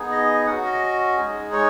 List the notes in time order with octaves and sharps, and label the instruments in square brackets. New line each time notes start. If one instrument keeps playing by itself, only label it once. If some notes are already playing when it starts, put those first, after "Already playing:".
Already playing: [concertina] B3 D#4 G#4
D#5
C#4 F#4 F#5
D#5
G#3 D#4 G#4
C#5